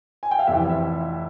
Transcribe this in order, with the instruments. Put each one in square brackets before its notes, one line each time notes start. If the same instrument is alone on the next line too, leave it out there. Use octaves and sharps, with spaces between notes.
[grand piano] G#5
G5
F5
F1 F2 E3 E5
E5